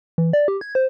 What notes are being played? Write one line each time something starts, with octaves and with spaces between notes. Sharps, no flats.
E3
D5
G4
G#6
C5